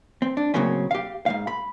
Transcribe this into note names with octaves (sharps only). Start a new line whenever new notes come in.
C4
D4
A2 C#3 F#3 A#3 C4 C#4
G4 F5
G#2 C#3 F5
B5